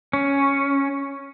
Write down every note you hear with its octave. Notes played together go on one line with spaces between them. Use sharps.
C#4